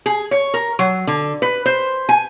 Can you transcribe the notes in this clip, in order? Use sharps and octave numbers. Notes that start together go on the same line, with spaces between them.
G#4
C#5
A#4
F#3
D3
B4
C5
G#5